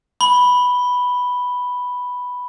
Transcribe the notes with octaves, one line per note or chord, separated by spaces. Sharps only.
B5 G7